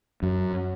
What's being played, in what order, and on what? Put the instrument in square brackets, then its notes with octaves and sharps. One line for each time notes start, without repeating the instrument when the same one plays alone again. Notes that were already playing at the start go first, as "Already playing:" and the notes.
[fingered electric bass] F#2 [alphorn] F#3